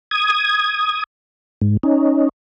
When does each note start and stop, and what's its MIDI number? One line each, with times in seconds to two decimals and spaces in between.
0.11 1.03 87
0.11 1.03 92
1.62 1.77 44
1.83 2.29 61
1.83 2.29 63